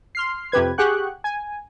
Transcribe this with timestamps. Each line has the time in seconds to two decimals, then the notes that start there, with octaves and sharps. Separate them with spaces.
0.15 C6 F6 C7
0.52 F2 C3 G4 B4 G#6
0.78 G4 G#4 F#5 G5 C#6 F#6
1.24 G#5